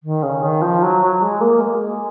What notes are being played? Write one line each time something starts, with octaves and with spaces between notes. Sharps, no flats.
D#3
C#3
D#3
F3
F#3
F#3
G#3
A#3
G#3
G#3